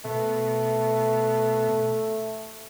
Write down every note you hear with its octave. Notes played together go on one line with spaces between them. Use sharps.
B2 A3